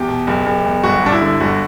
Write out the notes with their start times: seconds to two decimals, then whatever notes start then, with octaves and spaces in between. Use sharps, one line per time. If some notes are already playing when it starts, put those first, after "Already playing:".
Already playing: E2 G4
0.08 B2
0.27 F#1
0.46 F#1
0.65 E2
0.83 G1 F#4
1.03 G2 D4
1.12 E4
1.22 D3
1.40 G1 F#4